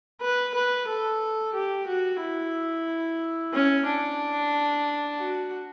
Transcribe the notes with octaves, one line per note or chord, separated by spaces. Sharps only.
B4
B4
A4
G4
F#4
E4
C#4
D4
F#4